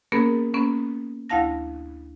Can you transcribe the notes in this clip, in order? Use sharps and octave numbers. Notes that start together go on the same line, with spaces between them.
A#3 B3 C#4 G#4 A#4
A#3 B3 C#4
D2 E4 F5 A5 A#6